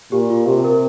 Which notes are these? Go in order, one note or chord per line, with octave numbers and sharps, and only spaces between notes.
A#2 G4
F4
C3 G4
A#4